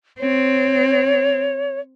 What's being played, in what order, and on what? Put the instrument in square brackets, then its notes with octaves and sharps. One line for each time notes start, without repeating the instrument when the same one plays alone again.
[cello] C4 [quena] C#5